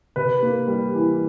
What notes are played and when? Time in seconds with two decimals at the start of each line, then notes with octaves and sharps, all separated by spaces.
0.16 C3 B4
0.42 A#3
0.68 G3
0.94 E3